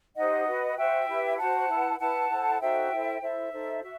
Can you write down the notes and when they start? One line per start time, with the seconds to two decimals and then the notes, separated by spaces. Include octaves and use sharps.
0.15 D#4 G4 C5 D#5 F#5
0.46 F#4 B4
0.76 F#4 C5 E5 G5
1.08 E4 G4 B4
1.38 F#4 C5 F#5 A5
1.69 E4 B4
1.99 E4 B4 F#5 A5
2.29 E4 A4 C5
2.60 D#4 F#4 A4 C5 E5 G5
2.91 E4 A4 C5
3.21 E4 A4 C5 E5
3.52 D#4 A4 C5
3.83 F#4 E5